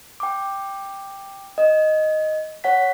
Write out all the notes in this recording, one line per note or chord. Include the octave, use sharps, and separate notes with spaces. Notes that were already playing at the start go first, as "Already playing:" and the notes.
G5 D6
D#5
C#5 F#5 B6